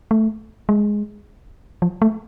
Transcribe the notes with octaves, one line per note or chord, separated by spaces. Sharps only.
A3
G#3
F3
A3